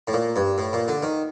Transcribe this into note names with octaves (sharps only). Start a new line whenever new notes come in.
A2
A#2
G2
A2
A#2
D3
D#3